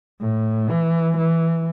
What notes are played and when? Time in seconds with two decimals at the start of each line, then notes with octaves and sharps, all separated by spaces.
0.21 A2
0.70 E3
1.18 E3